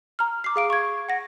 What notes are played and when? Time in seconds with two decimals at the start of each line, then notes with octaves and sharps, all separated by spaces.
0.19 A#5 F6
0.44 D6 C7
0.56 G#4 F5 D7
0.70 C#6 G#6
1.09 F#5 A#6